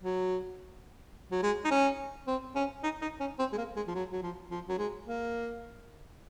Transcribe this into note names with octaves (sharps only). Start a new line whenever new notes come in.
F#3
F#3
G#3
D#4
C#4
C4
C#4
D#4
D#4
C#4
C4
G#3
A#3
G#3
F3
F#3
F#3
F3
F3
F#3
G#3
A#3